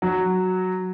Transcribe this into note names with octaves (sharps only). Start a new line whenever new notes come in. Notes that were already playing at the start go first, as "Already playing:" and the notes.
F#3